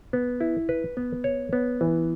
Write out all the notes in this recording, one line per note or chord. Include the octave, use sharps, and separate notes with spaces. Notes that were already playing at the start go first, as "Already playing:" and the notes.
B3
E4
B4
B3
C#5
B3
E3